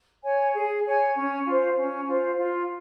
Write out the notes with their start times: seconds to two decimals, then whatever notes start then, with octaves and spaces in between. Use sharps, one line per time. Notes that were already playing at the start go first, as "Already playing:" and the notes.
0.24 C#5 G#5
0.54 G#4
0.85 C#5 G#5
1.15 C#4
1.46 F4 C5
1.76 C#4
2.07 F4 C5
2.37 F4